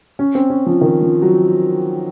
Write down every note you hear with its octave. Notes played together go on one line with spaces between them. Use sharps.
C#4
C4
C#4
F3
D#3
F3
F#3